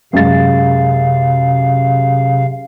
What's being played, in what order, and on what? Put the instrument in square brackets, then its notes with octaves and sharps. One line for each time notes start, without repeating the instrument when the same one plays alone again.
[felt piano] F#2 G#3 A6 [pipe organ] C3 F5